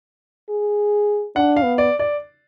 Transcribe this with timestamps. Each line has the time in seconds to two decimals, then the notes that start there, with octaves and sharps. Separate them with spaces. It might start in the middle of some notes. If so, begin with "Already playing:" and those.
0.50 G#4
1.36 D4 F#5
1.56 F5
1.64 B3
1.78 D5
1.99 D5